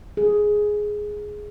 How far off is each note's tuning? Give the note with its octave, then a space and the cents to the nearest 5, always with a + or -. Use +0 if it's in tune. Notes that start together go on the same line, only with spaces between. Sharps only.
G#4 +5